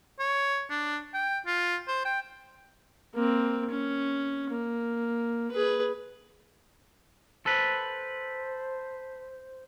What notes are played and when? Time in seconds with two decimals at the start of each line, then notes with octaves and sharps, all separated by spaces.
0.19 C#5
0.70 D4
1.14 G5
1.46 F4
1.87 C5
2.05 G5
3.15 A#3 C4
3.70 C#4
4.51 A#3
5.52 G#4 B4
7.46 A4 B4 C5